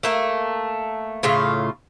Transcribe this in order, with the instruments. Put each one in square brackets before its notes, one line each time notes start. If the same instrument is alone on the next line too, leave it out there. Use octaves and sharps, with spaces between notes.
[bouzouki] A3 A#3
A2 C#3 F4